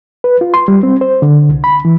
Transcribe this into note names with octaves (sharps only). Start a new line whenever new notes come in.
B4
F4
C6
G3
C4
C5
D3
C2
B5
E3